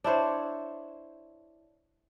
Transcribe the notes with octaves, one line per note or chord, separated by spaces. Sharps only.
D4 E4 C5 C#5